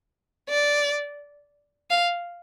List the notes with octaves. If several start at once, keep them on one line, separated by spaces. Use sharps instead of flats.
D5
F5